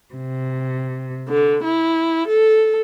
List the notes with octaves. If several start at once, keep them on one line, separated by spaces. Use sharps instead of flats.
C3
D3
E4
A4